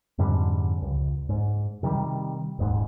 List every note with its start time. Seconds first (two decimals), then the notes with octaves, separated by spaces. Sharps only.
0.18 F2 G#2 D3 G3
0.82 C#2
1.29 G#2
1.83 C3 D#3 F#3 G3
2.59 D#1 G#2